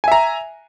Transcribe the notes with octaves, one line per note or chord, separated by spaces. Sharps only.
E5 G#5 A#5